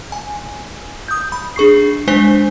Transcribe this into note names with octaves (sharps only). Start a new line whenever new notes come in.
G#5
D#6 G6
B5
D4 G#4 C#6 C7
G#3 D4 C5 G#5 B6 G7